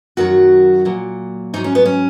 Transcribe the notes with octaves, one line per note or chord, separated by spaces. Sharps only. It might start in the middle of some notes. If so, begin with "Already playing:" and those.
F#2 D#3 F#3 F#4
A#2 F#3
G#2 F#3 D#4
C#4
B3
C#4